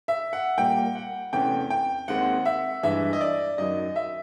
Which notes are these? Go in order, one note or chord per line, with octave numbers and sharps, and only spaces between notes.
E5
F#5
A#2 G3 A#3 G5
F#5
E2 C3 E3 A3 C#4 G5
G5
D#2 D#3 G#3 C4 F#5
E5
G2 E3 G#3 E5
D#5
D5
F#2 D#3 F#3 D#5
E5